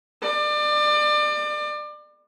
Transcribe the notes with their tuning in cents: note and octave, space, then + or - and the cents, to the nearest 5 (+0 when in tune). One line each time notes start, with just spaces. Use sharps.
D5 +30